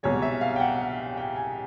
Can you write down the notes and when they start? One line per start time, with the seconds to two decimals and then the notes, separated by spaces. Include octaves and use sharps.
0.03 C2 B2 G#3 C#5
0.22 E5
0.41 F5
0.56 G5
0.60 F#5
1.17 G5
1.36 G#5